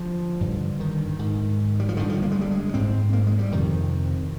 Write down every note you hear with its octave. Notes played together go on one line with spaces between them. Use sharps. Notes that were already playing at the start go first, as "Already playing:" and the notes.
Already playing: D3 F3
G2 D3
D#3
G#2
G3
F3
G2 D3 D#3
F3
A#3
G#3
G3
G#3
G#2 C4
A#3
G#3
G3
F2 C3 D#3